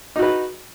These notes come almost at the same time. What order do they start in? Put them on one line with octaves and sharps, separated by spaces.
D#4 F#4 B4